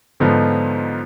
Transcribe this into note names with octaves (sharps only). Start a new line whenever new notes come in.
G#2 D3 F3 B3 D#4 F4